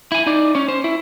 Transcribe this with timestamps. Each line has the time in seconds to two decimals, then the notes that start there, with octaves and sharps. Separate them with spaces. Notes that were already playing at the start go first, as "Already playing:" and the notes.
0.12 E4 G#5
0.27 D#4 D5
0.55 C#4 C#5
0.68 C5
0.84 E4